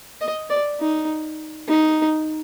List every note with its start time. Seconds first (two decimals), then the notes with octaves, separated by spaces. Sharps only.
0.21 D#5
0.50 D5
0.80 D#4
1.68 D#4